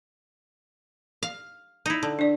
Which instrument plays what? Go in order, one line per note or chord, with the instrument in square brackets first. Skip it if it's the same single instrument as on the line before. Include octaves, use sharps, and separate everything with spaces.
[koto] F5
D#4 E4
D3
[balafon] D4 D5